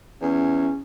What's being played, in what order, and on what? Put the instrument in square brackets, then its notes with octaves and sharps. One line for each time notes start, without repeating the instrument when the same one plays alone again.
[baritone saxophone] E2 [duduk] C#4